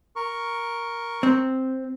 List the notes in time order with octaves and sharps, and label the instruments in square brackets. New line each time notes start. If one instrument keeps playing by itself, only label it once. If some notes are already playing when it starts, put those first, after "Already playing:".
[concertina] A#4 C#6
[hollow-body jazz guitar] C4